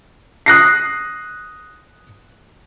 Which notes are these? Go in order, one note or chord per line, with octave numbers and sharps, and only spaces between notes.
D#6 F#6 A#6 C7